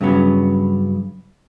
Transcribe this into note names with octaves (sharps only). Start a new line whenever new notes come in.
G2 C#3 F#3 B3 C#4